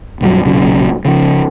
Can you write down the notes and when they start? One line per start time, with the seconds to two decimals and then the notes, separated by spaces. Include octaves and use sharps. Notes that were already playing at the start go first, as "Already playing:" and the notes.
0.21 B1 G2 D#3 F#3
0.46 B1 A#2 C#3 F#3
1.05 C#3 F3